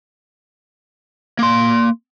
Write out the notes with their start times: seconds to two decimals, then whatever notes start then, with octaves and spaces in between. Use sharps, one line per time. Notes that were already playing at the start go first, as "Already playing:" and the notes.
1.39 A#3 C6